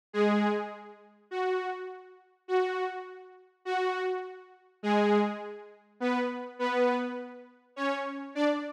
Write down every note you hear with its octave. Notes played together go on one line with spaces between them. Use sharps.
G#3 G#4
F#4
F#4
F#4
G#3 G#4
B3 B4
B3 B4
C#4 C#5
D4 D5